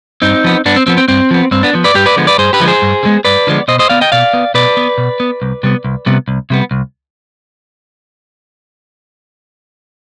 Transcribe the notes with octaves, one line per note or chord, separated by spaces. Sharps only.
G2 C4 D#4
F3 B3
G2 B3 D4
C4
F3 B3 C4
C4
G2 C4
F3 B3
G2 C4
B3 D4
F3 B3
B4 D5
G2 G4 B4
B4 D5
D3 F3 G#3 B3
B4 D5
G2 G#4 C5
G4 B4
D3 F3 G#3 B3
G#4 C5
G2
D3 F3 G#3 B3
G2 B4 D5
D3 F3 G#3 B3
B2 C5 D#5
C5 D#5
B3 D5 F5
D#5 G5
B2 D5 F5
B3
B2 B4 D5
B3
B2
B3
C2
C3 G3 B3
C2
C3 G3 B3
C2
C3 G3 B3
C2